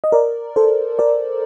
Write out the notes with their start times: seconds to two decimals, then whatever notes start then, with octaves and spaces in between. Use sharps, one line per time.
0.04 D#5
0.12 A#4 D5
0.56 A4 C5
0.99 A#4 D5